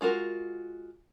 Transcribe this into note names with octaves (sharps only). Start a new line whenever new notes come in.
G#3 F4 F#4 A#4